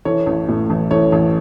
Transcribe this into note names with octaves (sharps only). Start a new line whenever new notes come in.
E3 A4 C#5
A1
A2
A1
E3 A4 C#5
A1